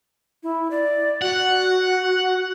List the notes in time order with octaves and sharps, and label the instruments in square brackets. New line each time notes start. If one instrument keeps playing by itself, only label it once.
[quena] E4
D5
[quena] F#4 [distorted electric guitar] F#5